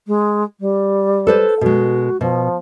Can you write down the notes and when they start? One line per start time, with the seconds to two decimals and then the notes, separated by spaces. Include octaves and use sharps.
0.07 G#3
0.60 G3
1.27 A4 B4 C5
1.61 B2 G#3 F#4
2.21 B2 F3